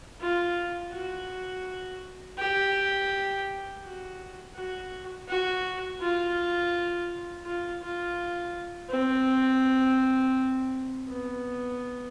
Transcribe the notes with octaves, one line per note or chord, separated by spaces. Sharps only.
F4
F#4
G4
F#4
F#4
F#4
F4
F4
F4
C4
B3